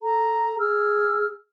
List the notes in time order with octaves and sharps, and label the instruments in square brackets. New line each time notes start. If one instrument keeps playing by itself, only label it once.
[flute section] A4 A#5
G#4 E6 F6